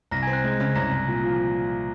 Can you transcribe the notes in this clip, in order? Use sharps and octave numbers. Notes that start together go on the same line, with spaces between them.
C2 A#5 A#6
C4 G#5 G#6
F#6
G#3
C#3
C2 A#5 A#6
C2
A#2
F3